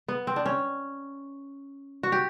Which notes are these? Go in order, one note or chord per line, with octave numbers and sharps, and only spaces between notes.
B3
C4
D4
C#4
F#4
G4